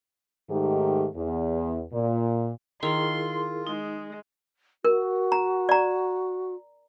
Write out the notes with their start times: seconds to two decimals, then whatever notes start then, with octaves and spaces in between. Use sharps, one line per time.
0.50 G#2 D#3 A3 G4
1.15 E2
1.92 A#2
2.83 D#3 E4 F4 G#4 A#4 F5 C6
3.67 G#3 D#4
4.85 F#4 A#4
5.32 A#5
5.69 D5 A#5